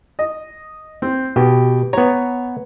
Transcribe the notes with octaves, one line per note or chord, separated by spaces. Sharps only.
D#5
C4
B2 G4
B3 C#5 A#5